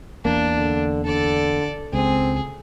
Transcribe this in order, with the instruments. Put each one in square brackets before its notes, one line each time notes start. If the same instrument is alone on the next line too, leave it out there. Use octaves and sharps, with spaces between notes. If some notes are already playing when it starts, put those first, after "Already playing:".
[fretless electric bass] E2 A#3 [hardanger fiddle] D4
[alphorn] D3
[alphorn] D3 [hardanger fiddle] A4 D5
[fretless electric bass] C#2 [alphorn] C4 [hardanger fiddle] G#4